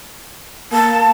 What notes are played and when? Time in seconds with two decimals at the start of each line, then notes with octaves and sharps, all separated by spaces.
0.72 A#3 A5